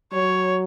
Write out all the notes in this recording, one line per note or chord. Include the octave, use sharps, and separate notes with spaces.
F#3 C#5